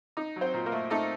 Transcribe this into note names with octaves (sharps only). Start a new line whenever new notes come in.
D#4
F#3
C4 C5
A#2
A#3 A#4
A3
A3 D#4 A4